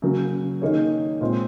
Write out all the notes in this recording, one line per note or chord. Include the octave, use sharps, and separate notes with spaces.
C#3 F#3 A#3 C#4
D#3 A#3 D#4 G#4 C#5
A#2 G#3 C4